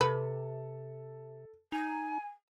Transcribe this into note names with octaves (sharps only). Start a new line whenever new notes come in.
C3 A4 B4
D#4 G#5